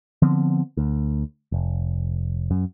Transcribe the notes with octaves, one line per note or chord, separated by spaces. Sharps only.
D3 F3 B3 C4
D2
F1
F#2